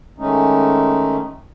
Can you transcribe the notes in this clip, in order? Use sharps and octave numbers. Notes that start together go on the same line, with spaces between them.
D#3 G#3 A3 C#4 D#4